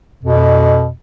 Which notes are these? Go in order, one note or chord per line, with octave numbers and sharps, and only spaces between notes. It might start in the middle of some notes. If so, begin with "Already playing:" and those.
F2 B2